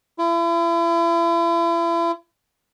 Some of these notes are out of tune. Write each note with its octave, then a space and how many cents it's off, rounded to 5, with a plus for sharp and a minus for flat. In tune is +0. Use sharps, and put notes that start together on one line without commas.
E4 +40